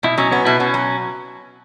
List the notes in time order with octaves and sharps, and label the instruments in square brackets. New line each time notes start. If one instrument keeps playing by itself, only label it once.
[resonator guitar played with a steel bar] B2 [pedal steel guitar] E4
[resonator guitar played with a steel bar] F#3 [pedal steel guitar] C#4
[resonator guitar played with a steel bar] B3 [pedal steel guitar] C#4
[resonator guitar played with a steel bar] B2 [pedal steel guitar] E4
[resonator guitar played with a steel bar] B2 [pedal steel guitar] C#4
[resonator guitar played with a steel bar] F#3